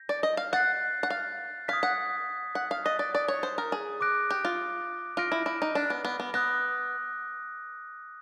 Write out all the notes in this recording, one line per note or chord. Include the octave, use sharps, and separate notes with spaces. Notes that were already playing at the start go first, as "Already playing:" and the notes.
Already playing: G6 A#6
D5
D#5
F5
F#5 F#6 A6 C7
F#5
F5
F5 D#6 G#6 B6
F#5
F#5
F5
D#5 D#6 F#6 A6
D5
D5
C#5
C5
A#4
G#4
D6 F#6 A#6 D7
G4
F4
F4 F6 A#6 D7
E4
E4
D#4
D4
B3
B3
B3
B3 D#6 F#6 A#6